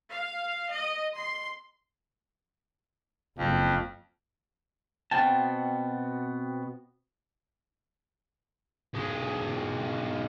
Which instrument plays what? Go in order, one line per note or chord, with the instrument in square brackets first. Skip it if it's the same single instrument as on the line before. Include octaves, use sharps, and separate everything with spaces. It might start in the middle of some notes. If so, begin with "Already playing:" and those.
[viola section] F5
D#5
C6
[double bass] F#1 [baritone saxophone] F2
[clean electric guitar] B2 B3 C4 F#4 G5 A5
[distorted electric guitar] B1 G#3